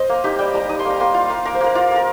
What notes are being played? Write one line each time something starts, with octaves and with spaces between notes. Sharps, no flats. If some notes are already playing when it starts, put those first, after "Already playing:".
Already playing: C5 D#5
A#3
D#4 G4
G3 G5
G3 A#5
D#4 D#6
C6
A#3
A#5
A#3 C6
F4
A#3
A#3 A#4
C5
A#3 A#4
A#3 F4
A#3 A#4